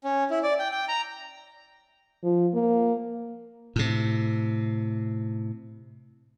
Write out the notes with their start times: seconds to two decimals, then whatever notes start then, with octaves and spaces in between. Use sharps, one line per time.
0.04 C#4
0.30 E4
0.43 D5
0.59 G5
0.72 G5
0.88 A#5
2.23 F3
2.54 A#3
3.76 A2 C3